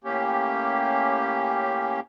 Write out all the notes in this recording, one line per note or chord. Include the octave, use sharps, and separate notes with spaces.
A2 A#3 C#4 G4